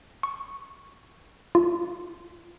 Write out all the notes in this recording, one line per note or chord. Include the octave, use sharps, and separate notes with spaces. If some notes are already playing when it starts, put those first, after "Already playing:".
C#6
F4